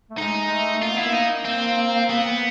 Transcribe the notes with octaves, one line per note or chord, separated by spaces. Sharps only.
A3
G#3 D#4
A3
A#3 F4
B3 E4
A#3
D#4
C4
B3